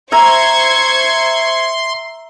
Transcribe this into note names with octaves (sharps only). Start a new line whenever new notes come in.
C5 E5 A#5 C6 C#6 G#6